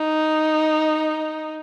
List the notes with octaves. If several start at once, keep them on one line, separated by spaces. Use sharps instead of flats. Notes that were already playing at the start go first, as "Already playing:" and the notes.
Already playing: D#4